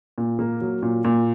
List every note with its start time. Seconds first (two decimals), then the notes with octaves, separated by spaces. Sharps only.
0.18 A#2
0.39 A#3
0.61 F#3
0.82 A#2
1.04 A#2